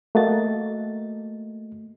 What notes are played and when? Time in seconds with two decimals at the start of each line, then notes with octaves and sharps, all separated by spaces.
0.15 A3 A#3 F#4 D#5 A6